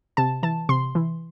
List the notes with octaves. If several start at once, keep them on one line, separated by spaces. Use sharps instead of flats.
C3 A5
E3 A5
C3 C6
E3